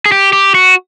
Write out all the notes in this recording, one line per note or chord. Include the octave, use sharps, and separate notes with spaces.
G#4
G4
G4
F#4